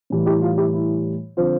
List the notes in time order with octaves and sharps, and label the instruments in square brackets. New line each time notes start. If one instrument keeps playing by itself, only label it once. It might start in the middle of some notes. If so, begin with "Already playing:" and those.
[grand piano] A2 E3 G3
E4 G4
F4
E4 G4
E4
D3 F3 C4 F4